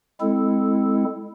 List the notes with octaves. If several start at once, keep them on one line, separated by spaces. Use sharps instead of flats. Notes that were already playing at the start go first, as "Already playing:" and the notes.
G#3 C4 E4 A4